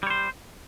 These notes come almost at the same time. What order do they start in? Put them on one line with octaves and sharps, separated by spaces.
G3 C#5 C5